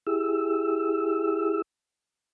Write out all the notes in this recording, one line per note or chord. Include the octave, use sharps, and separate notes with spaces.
E4 G4 G#4 E6